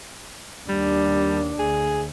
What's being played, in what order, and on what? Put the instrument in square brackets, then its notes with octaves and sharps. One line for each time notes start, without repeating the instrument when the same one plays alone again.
[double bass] D#2 D4 [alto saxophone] G3
[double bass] D2 [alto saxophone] G#4